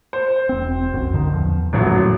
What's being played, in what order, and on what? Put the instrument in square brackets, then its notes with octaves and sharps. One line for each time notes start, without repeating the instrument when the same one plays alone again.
[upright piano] C5
[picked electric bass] E1 C4
C2 F#2
A2 D3 D#3
E2 F3
[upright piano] D#1 A1 F#3 [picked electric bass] F#2 A2 D#3